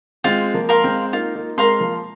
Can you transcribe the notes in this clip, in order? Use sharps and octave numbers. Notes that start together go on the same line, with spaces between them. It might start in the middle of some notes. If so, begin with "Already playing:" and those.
G#3 C4 F4
F3 A#3
A#4 F5 C6
G#3 C4
A#3 D#4 F4
A#3 D#4
G#3 C4 A#4 F5 C6
F3 A#3